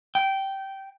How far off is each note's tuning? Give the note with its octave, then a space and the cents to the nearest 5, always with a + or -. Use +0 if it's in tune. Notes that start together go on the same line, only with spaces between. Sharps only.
G5 -15